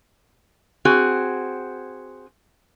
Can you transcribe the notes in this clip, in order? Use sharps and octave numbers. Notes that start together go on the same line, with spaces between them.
C4 F#4 G#4